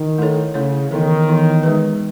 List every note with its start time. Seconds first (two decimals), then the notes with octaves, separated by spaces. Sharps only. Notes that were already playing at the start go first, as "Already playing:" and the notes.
Already playing: D#3
0.18 A3 E4 A4 C#5
0.54 C#3 A3 E4 A4 C#5
0.91 D#3 E3 B3 E4 A4 C#5
1.28 E3 B3 E4 A4 C#5
1.63 G#3 D#4 G#4 B4